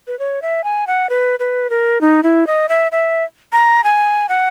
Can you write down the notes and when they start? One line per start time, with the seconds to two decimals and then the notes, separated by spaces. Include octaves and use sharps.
0.07 B4
0.19 C#5
0.42 E5
0.64 G#5
0.87 F#5
1.09 B4
1.39 B4
1.70 A#4
2.01 D#4
2.23 E4
2.47 D#5
2.69 E5
2.92 E5
3.52 A#5
3.84 G#5
4.29 F#5